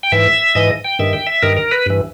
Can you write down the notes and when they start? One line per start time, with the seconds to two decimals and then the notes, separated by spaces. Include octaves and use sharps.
0.03 G5
0.12 G#2 E3 E5
0.55 G#2 E3 D#5
0.85 G5
0.99 G2 D#3 E5
1.13 G5
1.26 E5
1.42 G2 D#3 A#4
1.57 A#4
1.71 B4
1.86 G2 E3